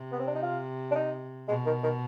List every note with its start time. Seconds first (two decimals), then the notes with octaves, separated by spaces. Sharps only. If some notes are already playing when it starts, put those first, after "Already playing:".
Already playing: C3
0.12 B3
0.19 C4
0.27 D4
0.35 D#4
0.43 F4
0.91 D4
0.95 D#4
1.48 B2 G#3
1.66 D#3
1.83 D#3